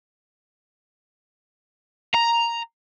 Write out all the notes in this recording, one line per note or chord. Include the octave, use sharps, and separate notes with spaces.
A#5